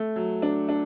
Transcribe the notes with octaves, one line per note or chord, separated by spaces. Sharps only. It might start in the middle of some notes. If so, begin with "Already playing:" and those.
Already playing: A3
F#3
D4
D4